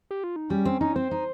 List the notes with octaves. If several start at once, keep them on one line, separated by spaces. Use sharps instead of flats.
G4
F4
D#4
G3 C#4
C4
C#4 D#4
C4 C5
D#4